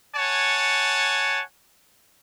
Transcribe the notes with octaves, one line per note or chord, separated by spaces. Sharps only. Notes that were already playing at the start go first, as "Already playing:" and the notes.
C#5 F#5 G#5 A5